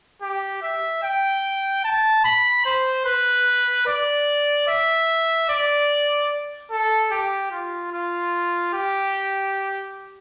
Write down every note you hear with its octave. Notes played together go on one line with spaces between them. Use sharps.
G4
E5
G5
A5
B5
C5
B4
D5
E5
D5
A4
G4
F4
F4
G4